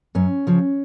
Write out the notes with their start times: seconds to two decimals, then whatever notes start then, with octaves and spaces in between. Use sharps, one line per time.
0.15 F#2 C#4
0.47 C#3 F3